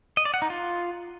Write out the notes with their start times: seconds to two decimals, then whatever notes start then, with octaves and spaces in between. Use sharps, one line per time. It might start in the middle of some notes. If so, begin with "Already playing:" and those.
0.17 D#5
0.25 D5
0.34 F#5
0.42 D#4
0.50 F4